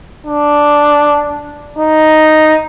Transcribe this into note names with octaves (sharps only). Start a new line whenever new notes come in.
D4
D#4